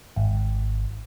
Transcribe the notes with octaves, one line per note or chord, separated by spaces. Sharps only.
G#1